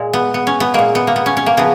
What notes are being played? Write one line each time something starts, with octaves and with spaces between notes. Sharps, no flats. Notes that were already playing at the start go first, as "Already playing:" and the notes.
Already playing: A#2 G#3
B3
B3
C#4
B3
A#2 G#3 A#3
B3
A#3
B3
C#4
C#4
A#3
C#3 F3 B3